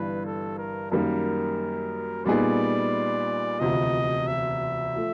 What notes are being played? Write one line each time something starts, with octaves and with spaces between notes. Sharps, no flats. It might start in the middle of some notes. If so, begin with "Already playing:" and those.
Already playing: G1 G2 E3 G3 B4
A4
A#4
F#2 D#3 G3 A#3 A#4
A#2 G3 B3 D#4 G#4 D5
E1 D2 C3 F3 D#5
E5
F3 A3